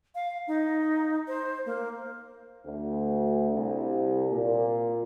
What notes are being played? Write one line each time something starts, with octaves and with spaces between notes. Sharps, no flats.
F5
D#4
C5
A#3
D2
C2
A#2